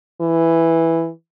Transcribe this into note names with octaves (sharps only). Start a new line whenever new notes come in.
E3